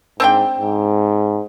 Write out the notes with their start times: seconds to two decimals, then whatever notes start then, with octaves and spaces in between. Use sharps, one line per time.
0.20 G#2 C4 D4 G5
0.59 G#2